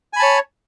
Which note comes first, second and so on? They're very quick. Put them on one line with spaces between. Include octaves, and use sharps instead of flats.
G#5 B5 A5 C#5